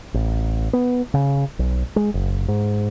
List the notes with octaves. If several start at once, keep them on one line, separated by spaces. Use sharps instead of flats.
A1
B3
C#3
B1
G#3
F#1
G#2